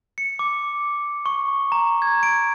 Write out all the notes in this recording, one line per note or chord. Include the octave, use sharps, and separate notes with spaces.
C#7
D6
C#6
A#5
G#6
D7